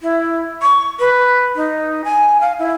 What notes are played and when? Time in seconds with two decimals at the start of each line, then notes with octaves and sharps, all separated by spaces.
0.01 E4
0.62 C#6
1.00 B4
1.56 D#4
2.05 G#5
2.41 F5
2.59 E4